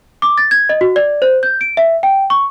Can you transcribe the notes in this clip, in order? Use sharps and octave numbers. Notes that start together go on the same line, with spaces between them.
D6
A6
G#6
D#5
F#4
D5
C5
G6
D7
E5
G5
C#6